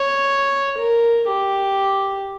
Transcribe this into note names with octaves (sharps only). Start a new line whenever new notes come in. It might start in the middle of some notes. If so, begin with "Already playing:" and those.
Already playing: C#5
A#4
G4